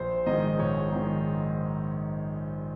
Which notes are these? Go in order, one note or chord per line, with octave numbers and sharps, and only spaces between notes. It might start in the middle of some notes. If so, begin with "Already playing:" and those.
Already playing: A#1 C5
G#2 D#3 D#5
A#1 C#5
G#2 D#3